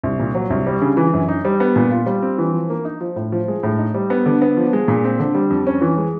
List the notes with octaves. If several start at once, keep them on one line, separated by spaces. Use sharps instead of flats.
C2
A#2
F#3
C2
G3
C#3
E3
F#2
D#4
G3
B3
A#2
F4
G3
C4
E3
F3
A#3
D#4
F3
A2
F3
G#3
A2
D#4
G3
B3
D3
B3
F3
G#3
A#2
C4
D3
G3
F2
C#4
E3
G#3